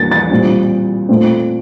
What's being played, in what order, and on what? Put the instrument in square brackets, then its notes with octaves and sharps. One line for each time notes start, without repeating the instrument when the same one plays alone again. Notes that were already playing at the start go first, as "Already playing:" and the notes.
Already playing: [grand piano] E3 G3 A#3 A6
A6
A#2 G3 C4
A#2 A3 C4